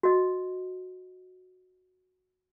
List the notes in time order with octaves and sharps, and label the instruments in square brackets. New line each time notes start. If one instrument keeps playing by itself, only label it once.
[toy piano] F#4 D#5